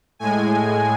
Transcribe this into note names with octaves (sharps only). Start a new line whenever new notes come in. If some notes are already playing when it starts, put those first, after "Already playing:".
A2 G#3 G#5